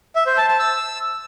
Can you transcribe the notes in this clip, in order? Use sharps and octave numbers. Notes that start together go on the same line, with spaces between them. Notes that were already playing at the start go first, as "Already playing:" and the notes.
E5
C5
A5
A5
E6